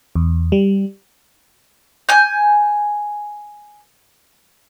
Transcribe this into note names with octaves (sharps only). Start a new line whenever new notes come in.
E2
G3
G#5 G6